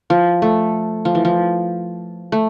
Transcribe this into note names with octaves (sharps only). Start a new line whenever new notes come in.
F3
A3
F3
E3
F3
A3